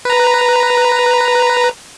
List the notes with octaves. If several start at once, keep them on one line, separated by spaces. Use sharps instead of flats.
B4 A#5